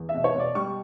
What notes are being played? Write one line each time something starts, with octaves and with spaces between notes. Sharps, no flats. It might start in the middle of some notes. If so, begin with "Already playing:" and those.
Already playing: E2
E5
B2
C#5
B2 D5
G3 C#6